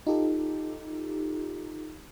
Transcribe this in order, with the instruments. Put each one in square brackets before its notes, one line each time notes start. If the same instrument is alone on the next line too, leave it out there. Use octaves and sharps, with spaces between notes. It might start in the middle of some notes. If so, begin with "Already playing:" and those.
[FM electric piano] D#4 F4 G4 A4